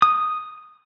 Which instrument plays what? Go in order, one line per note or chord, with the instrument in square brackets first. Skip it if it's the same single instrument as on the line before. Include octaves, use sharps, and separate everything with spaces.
[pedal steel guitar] D#6